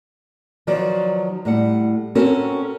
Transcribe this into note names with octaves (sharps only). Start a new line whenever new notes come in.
D#3 F3 F#3 F#4 B4 D5
A2 G3 F#5
C4 C#4 F#4 A4 A#4